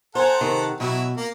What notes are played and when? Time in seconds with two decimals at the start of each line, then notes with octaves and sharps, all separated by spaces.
0.15 A4 C5 F#5 G#5 A#5
0.41 C3 D#3
0.80 B2 F#3 E4
1.17 A#3